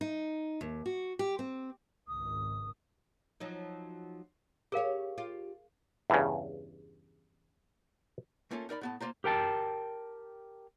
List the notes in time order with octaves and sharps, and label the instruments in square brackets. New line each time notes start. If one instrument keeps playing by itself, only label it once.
[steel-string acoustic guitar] D#4
D#2
F#4
G4
C4
[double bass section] G#1 C#2 [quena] D#6
[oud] F3 F#3 D#4
[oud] G4 C#5 [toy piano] G#4 A#4 F5
[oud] F4 G4
[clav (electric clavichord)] E2 G2 C#3
[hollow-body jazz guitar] A3 A#3 C#4 F4 A4
D#4 A#4 D5 B5
A2 B3 A5
A#3 F4 C5 A#5
[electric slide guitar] G4 A#4 G5 A5